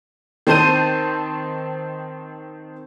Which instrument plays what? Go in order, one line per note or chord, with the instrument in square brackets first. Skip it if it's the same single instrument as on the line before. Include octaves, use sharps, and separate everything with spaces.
[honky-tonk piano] D#3 C4 C5 A5 G6 D#7